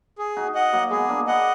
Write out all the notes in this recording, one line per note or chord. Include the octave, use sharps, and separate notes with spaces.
G#4
D#4 F#4
D#5 F#5
F#3 A#3
G#3 B3 G#4
A#3 D4
G#4 B4 D#5 F#5